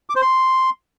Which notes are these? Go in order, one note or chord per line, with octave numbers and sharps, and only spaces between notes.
D6
C5
C6